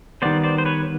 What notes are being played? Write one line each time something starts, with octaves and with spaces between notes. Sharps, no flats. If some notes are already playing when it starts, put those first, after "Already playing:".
D#3 G3 B3 C5 D5
C5 D5
C5
B4 C#5